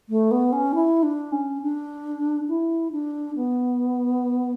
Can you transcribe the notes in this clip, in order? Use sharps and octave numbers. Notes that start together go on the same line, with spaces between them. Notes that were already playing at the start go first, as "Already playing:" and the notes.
A3
B3
C#4
E4
D4
C#4
D4
E4
D4
B3